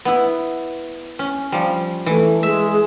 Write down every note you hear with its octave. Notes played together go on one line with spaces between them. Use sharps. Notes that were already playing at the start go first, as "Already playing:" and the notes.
B3 E4
C#4
F3 G3
E3 A3
G#3 E5